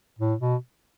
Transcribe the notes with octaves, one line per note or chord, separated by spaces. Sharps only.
A2
B2